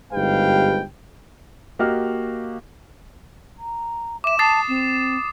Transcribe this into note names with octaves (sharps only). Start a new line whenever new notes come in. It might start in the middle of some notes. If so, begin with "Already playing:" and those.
G1 G#2 G4 B4 F5 G5
A#3 F#4 G4 D#5 F5 F6
A#5
E5 D6 E7
A5 D#6 A6 C7
C4